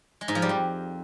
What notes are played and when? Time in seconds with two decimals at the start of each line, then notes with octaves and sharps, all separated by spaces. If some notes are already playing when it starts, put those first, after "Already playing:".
0.21 G#3
0.28 G#2
0.35 F3
0.42 G3
0.49 F2